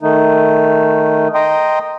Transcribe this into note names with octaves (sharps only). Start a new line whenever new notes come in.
D#3 A3 D#4
D#5 G5 A#5 C6 D#6